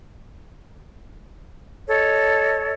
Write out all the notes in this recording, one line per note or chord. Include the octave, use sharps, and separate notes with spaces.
A4 C#5 D#5